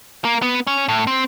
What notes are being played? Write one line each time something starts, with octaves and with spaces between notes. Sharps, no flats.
A#3
B3
C#4
A2
C4